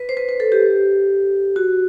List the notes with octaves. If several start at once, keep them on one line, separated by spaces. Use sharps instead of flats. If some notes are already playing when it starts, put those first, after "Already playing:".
Already playing: B4
C5
B4
B4
A4
G4
F#4